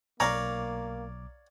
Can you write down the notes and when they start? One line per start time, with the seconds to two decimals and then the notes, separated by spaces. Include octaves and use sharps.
0.20 B1 A#3 C#5 D5 F5 A#5 D6